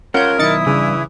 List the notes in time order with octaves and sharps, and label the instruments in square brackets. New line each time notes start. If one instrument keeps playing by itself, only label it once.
[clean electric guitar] C#4 F4 [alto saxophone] A#4 [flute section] C#5 [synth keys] F#5 G6
[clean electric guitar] B1 D#3 [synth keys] D#4 A6 C#7 [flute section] E4 D#6
[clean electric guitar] G2 [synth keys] C#3 [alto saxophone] E3